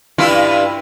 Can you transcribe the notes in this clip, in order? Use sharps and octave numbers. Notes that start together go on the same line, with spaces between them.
G2 E4 F4